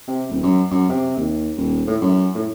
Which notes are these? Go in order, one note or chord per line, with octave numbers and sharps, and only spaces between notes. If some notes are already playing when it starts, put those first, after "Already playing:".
C3
D#1
F#2
F#2
C3
D#2
D#1
A2
F#2
A2